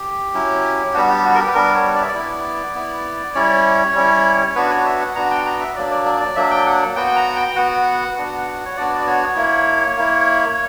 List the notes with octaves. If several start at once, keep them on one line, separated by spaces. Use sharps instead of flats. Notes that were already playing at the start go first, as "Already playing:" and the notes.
Already playing: G4
F#3 C#4 E4
G3 B3 D4 F#4
G4
F#4
A#4
G4
B4
G3 B3 D4 A#4
C#5
D5
E5
D5
B3 E4
B3 E4
G3 C#4 E4 C#5
G3 C#4 E4
B3 D4 F#4 B4
C#5
E5
F#5
B3 D4 F#4 A#5
G5
A#5
E5
F#3 A#3 D4 D5
D5
D5
D5
F#3 A#3 D4 E5
G5
F#5
B3 F#4 G5
G5
A#5
G5
B3 F#4 F#5
B3 D4 F#4
C#5
B3 D4 F#4 D5
D5
C#5
A#3 E4
A#3 E4